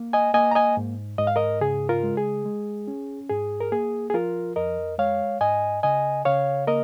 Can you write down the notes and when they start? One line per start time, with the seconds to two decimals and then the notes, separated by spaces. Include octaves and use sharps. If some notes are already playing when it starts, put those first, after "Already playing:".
Already playing: A#3
0.13 D#5 G#5
0.34 A#3 D#5 G#5
0.51 A#5
0.55 D#5 G#5
0.77 G#2
1.18 G#2 D#5
1.27 F5
1.36 A#4 D#5
1.61 C#3 G#4
1.89 F4 A#4
2.03 G#3
2.17 G#4
2.45 G#3
2.88 C#4
3.30 G#2 G#4
3.60 A#4
3.72 A#3 G#4
4.10 G#4
4.14 F3 F4 A#4
4.56 F2 A#4 D#5
4.99 G#3 C#5 F5
5.41 G#2 D#5 G#5
5.83 C#3 D#5 G#5
6.25 C#3 C#5 F5
6.67 A#3 A#4 D#5